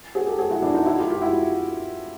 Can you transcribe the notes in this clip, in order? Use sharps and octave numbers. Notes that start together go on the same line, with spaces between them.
F#4 G#4
G4 A4
F#4 G#4
E4 F#4
D4 E4
D#4 F4
E4 F#4
F4 G4
F4 G4
E4 F#4